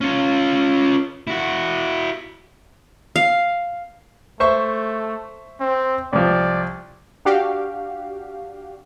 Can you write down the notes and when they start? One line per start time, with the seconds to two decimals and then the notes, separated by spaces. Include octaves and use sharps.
0.01 C#4 F4
1.27 E4 F#4
3.16 F5
4.40 A3 C5 E5 C#6
5.60 C4
6.13 C2 F3 D5
7.25 D4 F#4 G4 F5